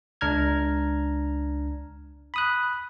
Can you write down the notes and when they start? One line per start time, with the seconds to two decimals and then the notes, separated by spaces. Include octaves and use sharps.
0.21 C#2 D4 A#5 F6 G#6
2.34 B5 D#6 F#6